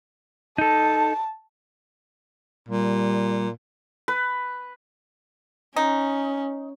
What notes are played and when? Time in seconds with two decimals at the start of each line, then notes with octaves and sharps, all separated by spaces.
0.58 D#4 A4 A5
2.68 A#2 G3
4.08 B4
5.76 C#4 D#4